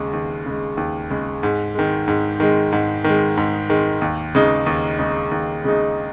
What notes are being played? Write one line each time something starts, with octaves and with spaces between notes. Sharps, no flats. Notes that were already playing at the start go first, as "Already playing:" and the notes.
Already playing: D#2 C#3 G#3
D#2
C#3 G#3
D#2
C#3 G#3
G#2
D#3 G#3
G#2
D#3 G#3
G#2
D#3 G#3
G#2
D#3 G#3
D#2
C#3 G#3 D#4
D#2
C#3 G#3 D#4
D#2
C#3 G#3 D#4